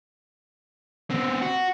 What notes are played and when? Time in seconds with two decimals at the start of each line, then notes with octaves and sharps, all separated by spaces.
1.10 B3 C4
1.41 F#4